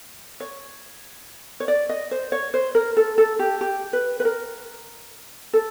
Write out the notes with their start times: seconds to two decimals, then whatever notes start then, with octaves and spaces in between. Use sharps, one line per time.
0.40 C#5
1.60 C#5
1.68 D5
1.89 D#5
2.11 C5
2.32 C#5
2.54 C5
2.75 A#4
2.97 A4
3.18 A4
3.39 G4
3.61 G4
3.93 B4
4.20 B4
4.25 A#4
5.53 A4